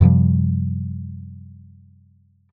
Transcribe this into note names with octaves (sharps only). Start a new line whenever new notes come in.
F#2 C3 F3 G3